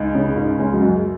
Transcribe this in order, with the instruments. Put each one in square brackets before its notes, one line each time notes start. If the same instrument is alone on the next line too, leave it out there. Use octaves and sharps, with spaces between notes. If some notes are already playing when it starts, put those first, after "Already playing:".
Already playing: [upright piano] C#2 G#3 D#4
[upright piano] C#3 [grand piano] C#4
[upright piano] C#2 [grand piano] D#4
[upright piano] G#3 [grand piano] C#4
[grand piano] F#3
[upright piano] F#2 [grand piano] G#3